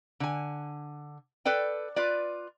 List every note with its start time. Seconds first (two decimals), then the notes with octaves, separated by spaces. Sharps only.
0.20 D3 G#5
1.45 A4 B4 D5 G5
1.96 F4 B4 D5